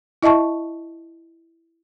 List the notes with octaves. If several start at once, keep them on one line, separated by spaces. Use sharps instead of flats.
E4 D#5 E5 A5 C#6